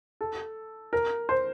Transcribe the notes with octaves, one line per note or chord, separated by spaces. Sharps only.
A4
A#4
C5